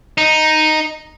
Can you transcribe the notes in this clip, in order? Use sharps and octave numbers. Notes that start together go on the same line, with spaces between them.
D#4